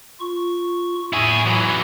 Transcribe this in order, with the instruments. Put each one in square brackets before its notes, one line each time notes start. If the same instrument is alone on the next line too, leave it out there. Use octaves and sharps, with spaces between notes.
[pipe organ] F4 C#6
[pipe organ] A2 C#6 [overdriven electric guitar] E4 G#4
[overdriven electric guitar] E3 F#3